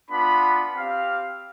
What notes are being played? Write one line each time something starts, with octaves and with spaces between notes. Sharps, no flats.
B3 D4 F4 B5
C4 G4 F5